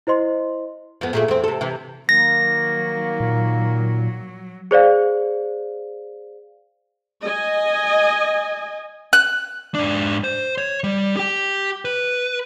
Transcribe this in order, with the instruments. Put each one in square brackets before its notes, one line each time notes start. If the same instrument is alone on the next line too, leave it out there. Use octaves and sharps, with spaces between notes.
[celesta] E4 C5 D#5 C6
[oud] F2 B3
A#2 A3 G#4
E2 C4
C3 A4
C3 E3
[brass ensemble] D#3 A#3 [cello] F#3 [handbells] A#6
[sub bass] A#2
[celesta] G#4 C5 D5 F5
[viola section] D#5 G#5
[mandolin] F#6
[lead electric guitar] G#2 D4
C5
C#5
G3
G4 G5
B4